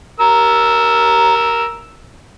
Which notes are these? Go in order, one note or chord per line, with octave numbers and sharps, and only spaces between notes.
A#4 E6